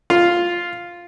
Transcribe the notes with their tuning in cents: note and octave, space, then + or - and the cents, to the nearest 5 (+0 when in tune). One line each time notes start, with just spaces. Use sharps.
F4 +0 F5 +0